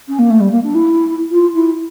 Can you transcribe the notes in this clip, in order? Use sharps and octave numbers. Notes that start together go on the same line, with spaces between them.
C#4
A#3
A3
G3
A#3
D4
E4
F4
E4